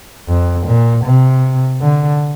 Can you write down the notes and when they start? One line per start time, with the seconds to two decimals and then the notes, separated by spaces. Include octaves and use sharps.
0.28 F2
0.67 A#2
1.05 C3
1.81 D3